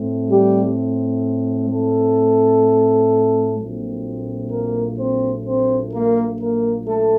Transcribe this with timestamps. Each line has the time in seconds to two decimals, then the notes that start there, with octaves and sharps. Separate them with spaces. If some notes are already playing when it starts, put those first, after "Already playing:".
Already playing: A2 A3 C4
0.30 G3 G4
1.70 A3 A4
3.58 A#1 A#2 F#3 A3 C4
4.51 A#3 A#4
4.98 C4 C5
5.45 C4 C5
5.92 A#3 A#4
6.39 A#3 A#4
6.86 A3 A4